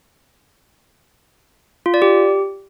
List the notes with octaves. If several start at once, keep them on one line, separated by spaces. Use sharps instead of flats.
F4
D5
G4